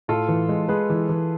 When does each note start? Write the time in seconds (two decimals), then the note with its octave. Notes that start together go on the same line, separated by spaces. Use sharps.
0.08 A2 F4 A4
0.29 E3
0.49 G#3
0.69 G#3 G#4 B4
0.90 E3
1.09 E3